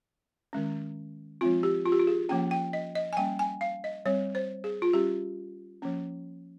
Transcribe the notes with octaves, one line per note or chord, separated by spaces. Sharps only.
D#3 G#3 C#4
F3 G#3 C4 F4
G4
F4
G4
F4
G#4
F3 A#3 C#4 G5
G5
D#5
D#5
G#5
G3 A#3 C#4 G5
G#5
F5
D#5
G3 C4 C#5
C5
G#4
F4
G3 C#4 G4
F3 A#3 C#4